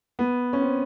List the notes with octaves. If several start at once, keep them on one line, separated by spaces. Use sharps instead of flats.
B3
C#4
C4